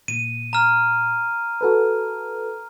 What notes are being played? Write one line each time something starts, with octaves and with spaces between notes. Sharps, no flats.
A#2 D#7
A#5 F6
F#4 A4 B4